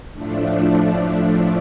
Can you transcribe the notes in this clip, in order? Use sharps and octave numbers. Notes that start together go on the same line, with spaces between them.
A2 F3 A3 D4